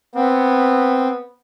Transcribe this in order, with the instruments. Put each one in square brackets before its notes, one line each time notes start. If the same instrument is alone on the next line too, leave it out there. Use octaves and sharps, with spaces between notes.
[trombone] B3 [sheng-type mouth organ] C4